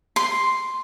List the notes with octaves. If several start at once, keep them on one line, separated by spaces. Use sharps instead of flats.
C6